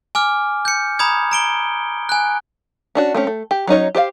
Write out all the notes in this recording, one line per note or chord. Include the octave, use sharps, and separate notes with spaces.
G#5 D6 F6
G6 C#7
A#5 B5 D#6 G#6
A#5 D7 G7
G#5 F#6
C#4 D4 F#4
A3 C4 C#4
A3
G4
F#3 C#4 D#4 C#5
G4 C5 C#5 F5